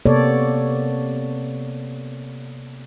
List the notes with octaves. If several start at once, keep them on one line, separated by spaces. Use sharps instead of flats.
C3 A#3 B3 A4 C#5 D5